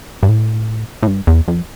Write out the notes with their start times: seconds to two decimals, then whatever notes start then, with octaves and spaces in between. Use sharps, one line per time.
0.23 G2
0.29 A2
1.03 A2
1.07 G2
1.27 E2
1.48 F2